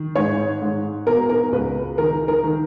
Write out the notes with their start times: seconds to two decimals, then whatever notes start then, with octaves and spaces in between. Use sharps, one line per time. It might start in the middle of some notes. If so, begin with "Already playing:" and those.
Already playing: D#3
0.15 G#2 C#5
0.62 G#2
1.07 B2 A#4
1.29 A#4
1.52 C#2 B4
1.98 D#3 A#4
2.28 A#4
2.43 D#3